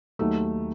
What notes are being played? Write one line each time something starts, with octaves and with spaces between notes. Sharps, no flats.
D#2 D#3 F#3 A3